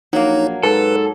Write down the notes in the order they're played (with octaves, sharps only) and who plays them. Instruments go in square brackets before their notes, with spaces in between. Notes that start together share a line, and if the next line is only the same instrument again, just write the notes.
[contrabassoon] A#1 [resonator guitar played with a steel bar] F#3 A#3 [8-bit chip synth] D#4 C#5
[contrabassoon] G#2 [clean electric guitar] A4 [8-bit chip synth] B4